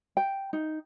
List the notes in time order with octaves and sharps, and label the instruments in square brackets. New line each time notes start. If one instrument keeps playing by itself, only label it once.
[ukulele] G5
D#4